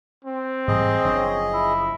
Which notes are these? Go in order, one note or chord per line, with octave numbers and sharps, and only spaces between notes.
C4
G#2 E3 G3 G#4 D#5
F#1 F3 D4 C#5
E4